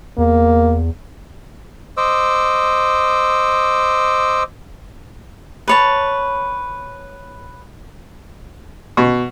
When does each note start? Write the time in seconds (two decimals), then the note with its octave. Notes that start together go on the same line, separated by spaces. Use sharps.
0.18 E2 A#3
1.97 C5 D#5 D6 E6
5.68 B4 C#5 A5
8.97 B2